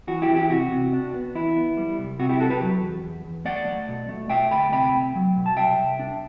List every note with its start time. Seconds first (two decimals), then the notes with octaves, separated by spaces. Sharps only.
0.07 E3 F#4
0.22 E4 G4
0.28 E3
0.36 E4 G4
0.50 C3 F#4
0.71 C3
0.93 D4
1.14 B3
1.35 E3 E4
1.56 B3
1.77 G3
1.98 C2
2.19 C3 F#4
2.29 E4 G4
2.39 C2 F#4 A4
2.50 G4 B4
2.61 F#3
2.82 E2
3.04 E2
3.24 E2
3.45 A3 D5 F#5
3.67 A3
3.89 B2
4.09 A3
4.30 A3 E5 G5
4.51 D2 G5 B5
4.72 C3 G5 B5
4.94 A3
5.15 F#3
5.36 B2
5.46 A5
5.56 C2 E5 G5
5.78 C2
5.99 D4